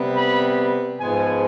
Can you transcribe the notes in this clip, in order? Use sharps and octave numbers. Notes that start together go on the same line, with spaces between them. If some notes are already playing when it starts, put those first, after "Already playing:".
Already playing: C3 G3 B3
B5
G#2 F3 G#3 B3 G#5